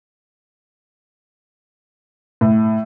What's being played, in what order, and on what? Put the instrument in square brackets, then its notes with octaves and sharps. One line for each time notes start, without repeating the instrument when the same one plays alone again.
[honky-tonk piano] A2